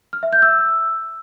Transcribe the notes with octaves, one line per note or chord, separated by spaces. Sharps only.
F6
E5
G6
E6